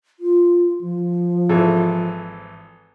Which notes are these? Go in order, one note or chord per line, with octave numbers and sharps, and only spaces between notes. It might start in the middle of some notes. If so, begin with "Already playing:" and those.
F4
F3
G#1 E3 A4